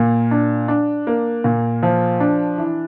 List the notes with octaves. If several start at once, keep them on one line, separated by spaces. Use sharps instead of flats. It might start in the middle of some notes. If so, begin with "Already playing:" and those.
Already playing: A#2 A#3
D4
D4
A#3
A#2
F3
D4
E3